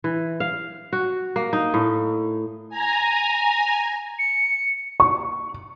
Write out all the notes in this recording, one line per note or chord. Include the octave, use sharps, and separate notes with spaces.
E3
F5
F#4
A#3
D#4
A2
G#5 A#5
C#7
C#6